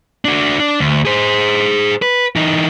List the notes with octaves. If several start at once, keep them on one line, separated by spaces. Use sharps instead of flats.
D4 F#4
D4
D2
G#4 C5
B4
E3 D#4